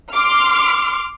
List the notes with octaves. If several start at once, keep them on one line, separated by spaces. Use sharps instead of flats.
C6 D6 F6